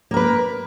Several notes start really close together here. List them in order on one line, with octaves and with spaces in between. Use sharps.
A#3 A#4 B4